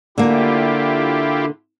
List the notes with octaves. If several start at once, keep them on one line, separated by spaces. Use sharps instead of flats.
D3 A#3 E4 F4 G4